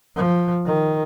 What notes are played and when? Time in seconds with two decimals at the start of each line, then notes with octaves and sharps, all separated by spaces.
0.16 F3
0.66 D#3